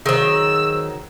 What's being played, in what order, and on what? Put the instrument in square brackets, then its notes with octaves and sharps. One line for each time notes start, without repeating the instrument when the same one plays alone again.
[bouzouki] D#3 F#3 [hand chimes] G#4 C5 [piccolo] E6